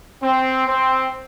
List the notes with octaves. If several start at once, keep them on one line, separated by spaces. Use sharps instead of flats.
C4
C4